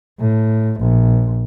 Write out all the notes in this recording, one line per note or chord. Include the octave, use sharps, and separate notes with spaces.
A2
A#1